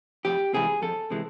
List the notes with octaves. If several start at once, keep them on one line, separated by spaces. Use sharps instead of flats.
F2 G4
C3 E3 G#3 G#4
F2 A4
C3 E3 G#3